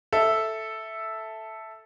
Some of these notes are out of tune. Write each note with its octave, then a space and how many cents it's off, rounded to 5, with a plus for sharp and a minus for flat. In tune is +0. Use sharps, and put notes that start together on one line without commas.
A4 +0 E5 +0